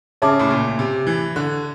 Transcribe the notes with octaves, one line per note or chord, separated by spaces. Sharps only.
C#3 C#5 E5 A5 D6
A2
A#2
C3
E3
D3